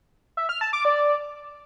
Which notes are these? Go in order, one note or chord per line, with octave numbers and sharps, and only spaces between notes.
E5
F6
A5
D6
D5